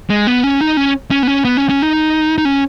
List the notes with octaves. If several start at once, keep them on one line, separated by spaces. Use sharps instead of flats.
G#3
B3
C#4
D#4
C#4
C#4
B3
C#4
B3
C#4
C#4
D#4
D#4
C#4